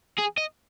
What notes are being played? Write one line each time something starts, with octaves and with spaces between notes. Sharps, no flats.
G#4
D#5